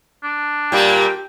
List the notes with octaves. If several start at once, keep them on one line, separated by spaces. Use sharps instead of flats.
D4
A#2 G3 A#3 G4 G5